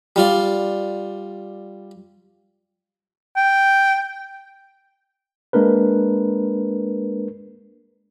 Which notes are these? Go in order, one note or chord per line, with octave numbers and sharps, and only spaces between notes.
G3 F4 D5
G5
G#3 A#3 D4 A#4 B4